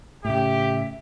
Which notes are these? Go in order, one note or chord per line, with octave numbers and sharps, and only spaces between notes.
A2 C#3 G4 E5